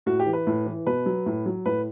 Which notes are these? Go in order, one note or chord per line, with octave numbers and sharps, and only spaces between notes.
A2 F#4
G4
E3
B4
A2
E3
B2 B4
F#3
A2
F#3
A2 B4